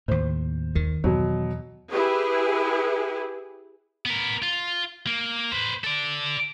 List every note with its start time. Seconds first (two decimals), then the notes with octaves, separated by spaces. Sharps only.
0.08 D#2 A2 C5
0.75 D#2 D#3
1.04 E2 B2 F#3
1.90 E4 G4 G#4 B4
4.06 B3 A#4
4.42 F4
5.07 A#3
5.52 B4 C5
5.84 A4 D5